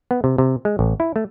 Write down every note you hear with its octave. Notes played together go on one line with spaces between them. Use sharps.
B3
C3
C3
G#3
A1
E4
A3